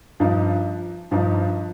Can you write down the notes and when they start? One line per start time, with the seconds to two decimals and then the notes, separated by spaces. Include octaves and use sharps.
0.20 G2 F3 D#4
1.11 G2 F3 D#4